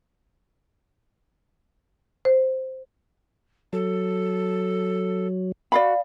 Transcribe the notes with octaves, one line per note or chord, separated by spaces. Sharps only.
C5
F#3 A4
F#4 D5 F5 B5